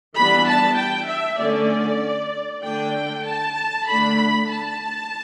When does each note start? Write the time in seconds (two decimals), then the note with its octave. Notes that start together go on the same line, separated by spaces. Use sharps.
0.16 E3 G3 B3 D4 B5
0.47 A5
0.77 G5
1.09 E5
1.39 D3 A3 C#4 D5
2.63 D3 A3 D4 G5
3.25 A5
3.86 D3 A3 D4 B5
4.49 A5